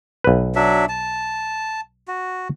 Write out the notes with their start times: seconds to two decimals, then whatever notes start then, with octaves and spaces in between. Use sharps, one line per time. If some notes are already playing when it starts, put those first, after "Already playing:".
0.24 B1 B4
0.55 F#3 D4 E5
0.89 A5
2.08 F#4